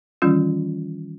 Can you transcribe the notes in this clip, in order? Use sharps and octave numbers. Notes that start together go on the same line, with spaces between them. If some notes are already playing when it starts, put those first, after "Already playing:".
D#3 E3 G3 C#4 F4